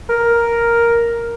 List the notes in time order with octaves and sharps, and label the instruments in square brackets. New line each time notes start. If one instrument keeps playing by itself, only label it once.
[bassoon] A#4